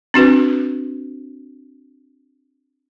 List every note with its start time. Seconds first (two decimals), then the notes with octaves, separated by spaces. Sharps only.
0.14 C4 D4 F#4 B4